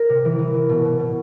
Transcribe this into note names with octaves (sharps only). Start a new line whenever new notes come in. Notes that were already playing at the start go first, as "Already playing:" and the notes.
Already playing: A#4
C3
E3
E3
E3
B2
B2
B2